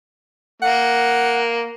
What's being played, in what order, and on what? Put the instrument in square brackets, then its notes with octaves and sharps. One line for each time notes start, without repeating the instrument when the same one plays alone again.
[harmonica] A#3 [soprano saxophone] F#5